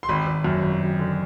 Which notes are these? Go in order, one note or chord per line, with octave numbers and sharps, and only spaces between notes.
C6
G#1 B5
G#1
F#2
G#1
G#1
D3